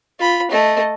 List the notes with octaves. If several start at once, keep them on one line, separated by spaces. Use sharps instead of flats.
F4 B5
A3 D#5